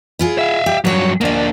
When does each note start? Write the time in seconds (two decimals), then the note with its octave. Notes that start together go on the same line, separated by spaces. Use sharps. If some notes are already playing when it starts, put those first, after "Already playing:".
0.19 E4 F4 G#4
0.39 E5 F5
0.66 G4
0.85 G2 F3 F#3 C#5
1.21 D2 A#3 D4 D#5